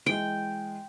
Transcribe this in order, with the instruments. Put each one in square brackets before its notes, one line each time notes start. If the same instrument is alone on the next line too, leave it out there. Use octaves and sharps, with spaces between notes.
[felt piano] E3 G#3 [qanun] G5